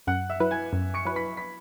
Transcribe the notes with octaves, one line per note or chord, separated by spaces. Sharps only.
F#2 F#5 F#6
E5 E6
F#3 E4 B4
G#5 G#6
F#2
C#6 C#7
F#3 E4 B4
B5 B6
B5 B6